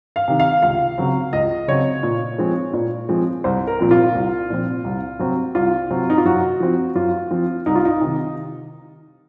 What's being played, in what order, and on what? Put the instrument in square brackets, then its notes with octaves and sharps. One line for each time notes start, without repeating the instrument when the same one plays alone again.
[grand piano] F5
C3 D#3
F5
C#2 F5
C#3 F#3 C4
C#2 D#5
C#3 F#3 C4 C#5
A#2
F3 G#3 C4
A#2
F3 G#3 C4
C2 C5
A#4
A#2 F3 C4
F4
C2
A#2 F3 C4
C2
C3 F#3 C4
C2 F4
C3 F#3 C4
D#4
F4
F#2 F#4
F3 C4
F#2 F4
F3 C4
C2 D#4
F4
D#4
C3 D#3